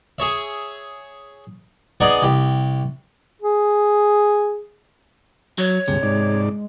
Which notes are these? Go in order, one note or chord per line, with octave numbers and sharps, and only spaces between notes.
G#4 C#5 E5
B3 D#4 G#4 D5
C2 G4
G#4
F#3 C#5
D2 G2 C3 G#3
G#2 G#3 D#4 D5